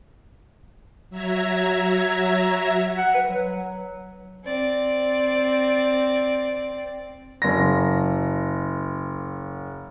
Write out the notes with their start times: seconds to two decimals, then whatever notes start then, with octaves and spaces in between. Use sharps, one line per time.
1.10 F#3 E5 A#5 G#6
2.98 F#5
3.14 B4
3.29 F#3
4.44 C4 D5
7.42 F#1 A#6